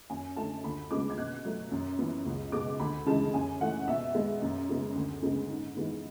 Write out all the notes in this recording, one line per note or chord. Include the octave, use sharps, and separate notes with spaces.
F#2 G#5
D3 A3 A5
D2 B5
C#3 G#3 B3 D6
G#6
B2 F#6
F#3 A3
F#2
E3 B3
C#2
B2 G#3 D6
D2 B5
C#3 E3 G#3 A5
F#2 G#5
E3 A3 F#5
B2 E5
G#3 B3
F#2
C#3 G#3 B3
D2
C#3 G#3 B3
G#2
E3 G#3 B3